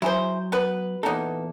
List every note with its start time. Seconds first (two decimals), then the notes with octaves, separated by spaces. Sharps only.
0.02 F#3 E4 G#4 C5
0.52 B3 B4
1.03 E2 A#2 B3 D#4 A4